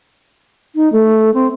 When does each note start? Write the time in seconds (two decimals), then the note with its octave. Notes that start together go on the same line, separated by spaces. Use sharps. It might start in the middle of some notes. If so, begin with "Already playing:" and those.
0.75 D#4
0.93 A3
1.34 C4